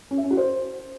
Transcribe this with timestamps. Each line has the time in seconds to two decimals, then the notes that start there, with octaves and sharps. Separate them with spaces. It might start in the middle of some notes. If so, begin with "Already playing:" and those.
0.11 C#4
0.17 E5
0.24 C#4
0.31 F#4
0.37 C5